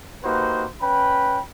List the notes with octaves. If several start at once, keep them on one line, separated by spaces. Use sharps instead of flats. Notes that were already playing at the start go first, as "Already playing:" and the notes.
A#3 D#4 F#4 G4 B4 C5
C#4 B4 G5 B5